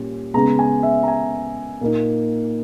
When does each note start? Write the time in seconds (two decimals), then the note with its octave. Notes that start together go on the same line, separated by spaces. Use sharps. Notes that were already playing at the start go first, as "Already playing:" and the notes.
Already playing: A#2 G3 C#4
0.34 C#3 G#3 B3 A#5
0.59 G#5
0.83 E5
1.03 A#5
1.08 G#5
1.81 A#2 A#3 D#4